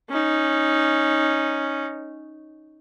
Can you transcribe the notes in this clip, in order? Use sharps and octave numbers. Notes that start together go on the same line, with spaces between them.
C#4 D#4